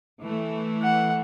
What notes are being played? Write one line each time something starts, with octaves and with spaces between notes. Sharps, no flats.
E3 A3
F#5